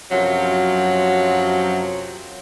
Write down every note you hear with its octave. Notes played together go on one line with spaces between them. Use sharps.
F#2 C3 F3 F#3